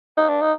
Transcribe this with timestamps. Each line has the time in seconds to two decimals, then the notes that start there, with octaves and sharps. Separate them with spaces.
0.17 D#4
0.29 D4
0.42 D#4